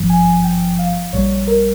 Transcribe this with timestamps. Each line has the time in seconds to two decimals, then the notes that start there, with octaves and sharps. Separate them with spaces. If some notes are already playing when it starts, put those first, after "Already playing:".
Already playing: G#1 G2 F3
0.10 G#5
0.44 G5
0.79 F5
1.13 A#1 A#2 G3 C#5
1.47 A#4